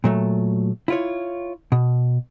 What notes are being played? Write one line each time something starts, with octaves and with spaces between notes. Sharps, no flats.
A#2 F#3 A3
E4 F4 C#5
B2